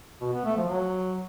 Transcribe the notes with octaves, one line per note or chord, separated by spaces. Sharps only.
B2
B3
A3
F3
F#3